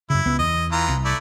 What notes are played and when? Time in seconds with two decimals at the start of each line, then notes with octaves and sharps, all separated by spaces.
0.10 F#2 C#3 E4
0.26 C#2 B3
0.39 E2 D#5
0.72 E3 F4 A#5
0.89 C2
1.05 A3 E4 D5